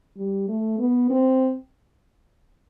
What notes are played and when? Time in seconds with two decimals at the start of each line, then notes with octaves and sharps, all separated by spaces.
0.17 G3
0.49 A3
0.79 B3
1.10 C4